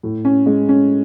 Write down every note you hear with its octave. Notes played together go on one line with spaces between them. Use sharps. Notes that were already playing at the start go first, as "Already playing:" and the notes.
A2
C#4
G#3
C#4